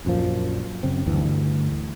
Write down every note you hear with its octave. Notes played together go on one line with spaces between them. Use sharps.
A#1 F#2 A#2 F3
F#2 C#3 C4
D2 G2 E3